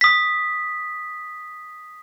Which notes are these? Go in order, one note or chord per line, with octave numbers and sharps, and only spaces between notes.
D#6 B6